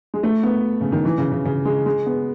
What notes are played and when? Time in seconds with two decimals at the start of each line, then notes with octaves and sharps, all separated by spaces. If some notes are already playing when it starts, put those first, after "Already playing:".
0.14 G#3
0.23 A3
0.43 B3
0.81 C#3
0.92 D#3
1.05 E3
1.18 C#3
1.32 C#3
1.45 C#3
1.65 G#3
1.86 G#3
2.06 B3